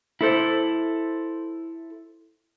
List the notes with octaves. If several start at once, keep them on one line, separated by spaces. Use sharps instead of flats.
E4 A4 C5